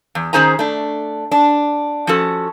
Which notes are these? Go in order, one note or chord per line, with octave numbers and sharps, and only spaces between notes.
E2
D#3 C#4 G#4 C5 G#5 A#5
A3 D4
D4
F3 C#4 F#4 A4